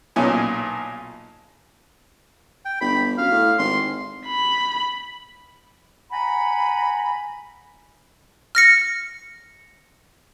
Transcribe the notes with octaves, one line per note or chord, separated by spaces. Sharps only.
B1 A#2 C#4 G#5
G5
G1 B5
F#2 F5
A2
G#1 C6
B5
F#5 G#5 A#5 B5
F6 A#6 C#7